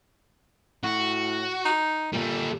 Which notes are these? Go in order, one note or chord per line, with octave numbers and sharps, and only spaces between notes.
A2 F#4
D#4
A#2 G3 A4